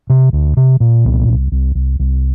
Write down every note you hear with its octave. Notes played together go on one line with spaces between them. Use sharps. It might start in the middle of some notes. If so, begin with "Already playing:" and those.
C3
D2
C3
A#2
C2
C2
C2
C2
C2